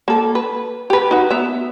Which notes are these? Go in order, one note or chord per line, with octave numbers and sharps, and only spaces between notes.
A#3 A4
B4
G4 B4
D#4 F#4
B3 E5